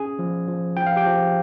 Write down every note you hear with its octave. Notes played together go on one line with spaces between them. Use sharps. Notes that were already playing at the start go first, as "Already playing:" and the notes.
Already playing: C#4 G#4 G#5
F3
F3
F3 G5
F5
G4 G5
F3